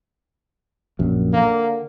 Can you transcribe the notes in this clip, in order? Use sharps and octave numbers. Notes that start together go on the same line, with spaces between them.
A#1 F#2
D3 A#3